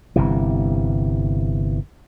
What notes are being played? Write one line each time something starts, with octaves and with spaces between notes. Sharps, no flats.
G1 C3 E3